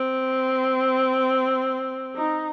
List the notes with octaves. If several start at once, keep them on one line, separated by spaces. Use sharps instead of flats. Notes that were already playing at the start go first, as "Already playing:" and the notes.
Already playing: C4
D#4